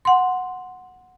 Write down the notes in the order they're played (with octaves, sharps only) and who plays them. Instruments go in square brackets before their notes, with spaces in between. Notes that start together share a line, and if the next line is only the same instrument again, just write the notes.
[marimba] F#5 C6